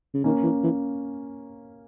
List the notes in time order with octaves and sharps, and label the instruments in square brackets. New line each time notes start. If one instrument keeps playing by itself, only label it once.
[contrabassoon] C#3
[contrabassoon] D#3 [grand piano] A#3 C#4
[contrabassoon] E3
E3